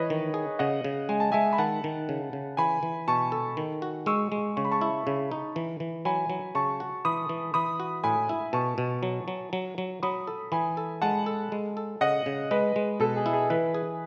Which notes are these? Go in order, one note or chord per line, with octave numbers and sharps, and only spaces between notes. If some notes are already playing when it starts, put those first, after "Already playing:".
Already playing: E3 B4 C#5 D#5
D#3
G#4
C#3 D#5 F#5
C#3
G#3 G#5
A5
G#3 E5 G#5
B5
D#3 F#5 A5
D#3
C#3
C#3
E3 G#5 B5
E3
B2 A5 C#6
A4
D#3
F#4
G#3 C#6 E6
G#3
C#3 C#6
B5
A5 C#6
E4
C#3
D#4
E3
E3
F#3 G#5 B5
F#3
C#3 A5 C#6
F#4
E3 B5 D#6
E3
E3 B5 D#6
F#4
A2 G#5 B5
E4
B2 A5 C#6
B2
F#3
F#3
F#3
F#3
F#3 B5 D#6
A4
E3 G#5 B5
A4
G#3 F#5 A5
A4
G#3
A4
C#3 D#5 F#5
C#3
G#3 B4 D#5
G#3
B2 A4
G#4
E4
G#4
E3 G#4 B4
G#4